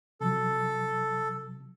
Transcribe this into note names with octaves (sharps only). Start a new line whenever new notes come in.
C3 F3 F#3 A4